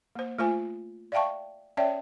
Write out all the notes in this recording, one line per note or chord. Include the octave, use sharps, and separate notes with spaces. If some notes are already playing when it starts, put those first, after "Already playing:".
A#3 C5
A3 F4 C5 G#5
D5 E5 F5 G5 A5 C#6
C#4 C#5 D5 E5 G5